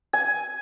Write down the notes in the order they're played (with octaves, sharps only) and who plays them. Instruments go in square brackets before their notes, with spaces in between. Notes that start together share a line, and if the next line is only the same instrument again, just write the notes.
[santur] G#5